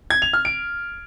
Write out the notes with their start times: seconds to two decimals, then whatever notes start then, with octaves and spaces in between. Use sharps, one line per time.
0.10 G#6
0.22 F7
0.33 F6
0.45 D7